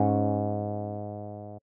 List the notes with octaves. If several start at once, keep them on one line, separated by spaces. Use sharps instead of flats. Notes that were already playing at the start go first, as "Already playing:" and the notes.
Already playing: G#2 C#4